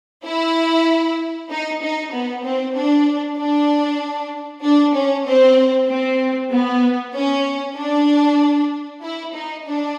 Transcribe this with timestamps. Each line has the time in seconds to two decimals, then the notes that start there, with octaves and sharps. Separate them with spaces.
0.24 E4
1.50 D#4
1.82 D#4
2.12 B3
2.44 C4
2.75 D4
3.38 D4
4.64 D4
4.94 C#4
5.26 C4
5.89 C4
6.51 B3
7.14 C#4
7.76 D4
9.02 E4
9.33 D#4
9.66 D4